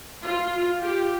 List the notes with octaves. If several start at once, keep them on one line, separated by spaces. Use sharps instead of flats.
F4
G4